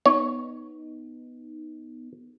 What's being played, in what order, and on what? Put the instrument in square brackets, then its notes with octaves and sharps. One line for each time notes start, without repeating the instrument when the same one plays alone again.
[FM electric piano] B3 D#4 [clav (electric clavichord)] C#5